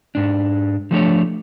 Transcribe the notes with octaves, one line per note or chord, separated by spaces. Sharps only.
G#2 D4
F3 A3 D4 C#5